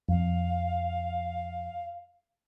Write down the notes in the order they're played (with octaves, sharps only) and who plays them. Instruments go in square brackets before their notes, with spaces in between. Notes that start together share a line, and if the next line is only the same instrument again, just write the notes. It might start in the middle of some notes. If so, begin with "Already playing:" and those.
[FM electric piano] F2 [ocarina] F5